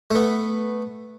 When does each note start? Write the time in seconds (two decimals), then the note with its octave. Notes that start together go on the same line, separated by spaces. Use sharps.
0.11 A3 B3